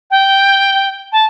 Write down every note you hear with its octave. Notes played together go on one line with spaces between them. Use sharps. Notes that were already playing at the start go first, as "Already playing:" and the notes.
G5
A5